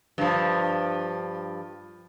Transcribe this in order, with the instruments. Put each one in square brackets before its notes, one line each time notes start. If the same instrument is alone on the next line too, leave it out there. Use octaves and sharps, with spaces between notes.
[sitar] G2 F3